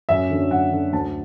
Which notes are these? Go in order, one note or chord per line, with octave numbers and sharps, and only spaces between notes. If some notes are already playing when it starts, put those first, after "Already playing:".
F#2 E5
D3 F#3
F#2 F#5
D3 F#3
D2 A5